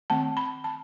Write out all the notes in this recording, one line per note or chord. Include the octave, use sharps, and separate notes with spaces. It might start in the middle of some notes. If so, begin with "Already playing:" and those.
D#3 A3 C4 A5
B5
A5